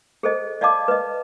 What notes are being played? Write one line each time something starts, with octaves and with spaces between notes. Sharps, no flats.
G#4 A4 C5 D#5
D5 D#5 F5 A5 D6
B4 D#5